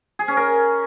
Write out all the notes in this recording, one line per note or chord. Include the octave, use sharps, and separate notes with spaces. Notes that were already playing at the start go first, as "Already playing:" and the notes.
G#4
C#4
A#4